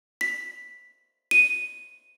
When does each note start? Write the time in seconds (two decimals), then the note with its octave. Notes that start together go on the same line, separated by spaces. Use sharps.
0.21 B6
1.31 D#7